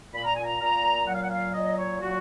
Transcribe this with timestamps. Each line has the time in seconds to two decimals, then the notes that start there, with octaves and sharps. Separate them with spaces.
0.14 A#2 B5
0.24 A#5
0.34 G#5
0.44 A#5
0.61 A#2 A#5
1.08 F#3 F#5
1.15 F5
1.23 F#5
1.31 F5
1.54 A#2 D#5
1.78 C#5
2.01 F#3 F#4